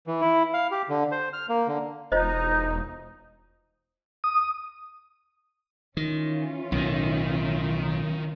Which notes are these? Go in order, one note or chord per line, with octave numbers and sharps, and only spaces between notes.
E3
E4
F5
G4
D3
C5
F6
A#3
D3
E1 D#4 F4 C5 D#5
D#6
D#3 E3 C#4 F4
B1 A2 D#3